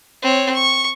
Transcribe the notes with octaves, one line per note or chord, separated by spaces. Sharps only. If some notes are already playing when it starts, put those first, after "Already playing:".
C4 C#5
C#6